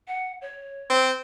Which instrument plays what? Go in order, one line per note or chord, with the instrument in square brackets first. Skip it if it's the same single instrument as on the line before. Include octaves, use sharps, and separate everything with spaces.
[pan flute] F#5
C#5
[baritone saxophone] C4